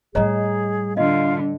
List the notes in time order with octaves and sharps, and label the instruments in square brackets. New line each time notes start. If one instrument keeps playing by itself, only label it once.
[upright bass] A2 G3 [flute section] G#4 [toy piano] C#5 D#5 A#5
[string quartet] D3 [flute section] F4 F5 [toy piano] D#5